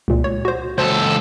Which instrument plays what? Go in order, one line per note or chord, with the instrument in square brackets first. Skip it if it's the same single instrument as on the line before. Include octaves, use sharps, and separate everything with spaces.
[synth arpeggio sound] C#2 A#2
C#5
F#4 C5
[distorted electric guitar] C#2 A4 [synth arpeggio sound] C5